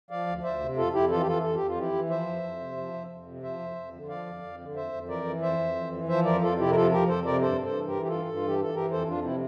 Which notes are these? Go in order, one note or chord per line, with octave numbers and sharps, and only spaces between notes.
F3 D5 F5
D2
D2 C5 E5
C3
F2 F4 A4
F2 E4 G4
E3 F4 A4
G4
E3 F4 A4
F2 A4
G4
F2
F4
E3 E4 G4
E3
F3 C5 E5
F2
F2
C3
F3
F2
F2
C3
F3 C5 E5
F2
F2
D3
F3 D5 F5
F2
F2
D3
F2 C5 E5
F2
E3 A#4 D5
E3
F2 C5 E5
F2
E3
E3
F3 C5 E5
F2 A#4 D5
F2 F4 A4
C3 E4 G4
A#4
F3 F4 A4
F2 G4 A#4
F2 A4 C5
C3 A#4 D5
G2 A4 C5
G2
A4 C5
E3
G4 A#4
E3
G4
G2 F4 A4
G2
F4
E3
G4
E3 A4
E3 G4 A#4
F2 A4 C5
F2 D4 F4
C3 C4 E4